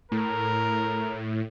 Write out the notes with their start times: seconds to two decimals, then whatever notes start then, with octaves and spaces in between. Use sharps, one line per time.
0.12 A2 A#4